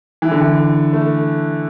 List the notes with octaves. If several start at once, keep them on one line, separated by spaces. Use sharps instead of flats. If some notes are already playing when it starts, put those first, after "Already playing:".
E3
D3
E3
A3